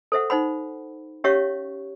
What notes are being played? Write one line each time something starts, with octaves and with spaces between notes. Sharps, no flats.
A4 C5 E5 F#5
D#4 C5 F#5 B5
C#4 G4 C#5 E5 F5 C#6